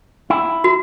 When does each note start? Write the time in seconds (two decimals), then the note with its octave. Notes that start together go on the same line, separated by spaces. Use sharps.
0.30 E4
0.64 F#4